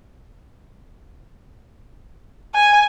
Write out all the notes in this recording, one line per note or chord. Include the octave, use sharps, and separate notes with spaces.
G#5